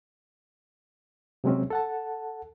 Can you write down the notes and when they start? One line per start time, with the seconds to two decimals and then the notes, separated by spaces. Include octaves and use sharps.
1.44 C3 F#3 G#3 C4 C#4
1.70 A4 F#5 A5